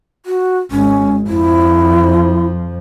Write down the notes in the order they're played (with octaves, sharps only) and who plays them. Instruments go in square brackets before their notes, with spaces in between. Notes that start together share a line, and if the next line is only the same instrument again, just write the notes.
[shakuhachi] F#4
[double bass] G#1 G#3 [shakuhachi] C#4
[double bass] F2 F3 [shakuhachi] E4